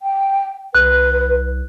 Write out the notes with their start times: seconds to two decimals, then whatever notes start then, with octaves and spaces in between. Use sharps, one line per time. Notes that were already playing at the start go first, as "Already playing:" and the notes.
0.02 G5
0.75 C2 B4 F#6